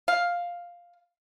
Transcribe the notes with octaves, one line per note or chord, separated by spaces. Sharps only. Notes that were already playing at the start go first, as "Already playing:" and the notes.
F5